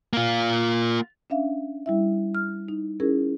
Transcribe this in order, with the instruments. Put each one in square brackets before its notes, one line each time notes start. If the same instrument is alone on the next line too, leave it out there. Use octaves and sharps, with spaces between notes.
[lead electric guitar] A#3 F4
[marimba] C#4 D4 E5 F5
G3 E4 E5
F6
D#4
C#4 E4 G#4 A#4